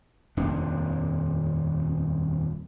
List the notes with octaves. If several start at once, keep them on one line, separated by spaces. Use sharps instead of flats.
D#1 F2 C3 D4